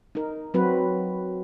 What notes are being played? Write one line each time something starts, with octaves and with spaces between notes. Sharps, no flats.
D#4 A#4
F#3 C4 F#4 B4